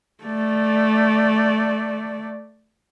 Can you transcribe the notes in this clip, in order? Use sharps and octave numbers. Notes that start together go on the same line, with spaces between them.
A3 D5